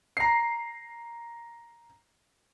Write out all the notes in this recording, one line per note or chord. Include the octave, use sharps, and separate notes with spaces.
A#5 C7